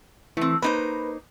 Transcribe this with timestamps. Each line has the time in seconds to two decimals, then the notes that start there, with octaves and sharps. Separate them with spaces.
0.37 E3 A3 C4
0.62 A#3 D#4 B4 C5